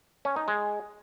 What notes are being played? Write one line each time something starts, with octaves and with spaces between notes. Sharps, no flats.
C#4
D#4
G#3